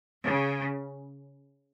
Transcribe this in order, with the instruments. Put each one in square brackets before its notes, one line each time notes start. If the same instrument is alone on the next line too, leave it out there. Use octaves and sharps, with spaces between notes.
[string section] C#3